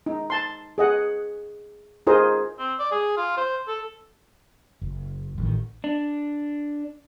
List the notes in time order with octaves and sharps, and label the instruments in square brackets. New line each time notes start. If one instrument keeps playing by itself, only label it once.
[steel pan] D#4
A5 C6
G#4 D#5 F#5
D#4 F4 G#4 A#4 C5 D#5
[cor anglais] C4
D5
G#4
F4
C5
A4
[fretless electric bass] F#1
A1 D#3
[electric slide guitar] D4